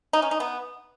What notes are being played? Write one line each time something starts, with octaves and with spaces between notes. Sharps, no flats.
D#4
C#4
D#4
B3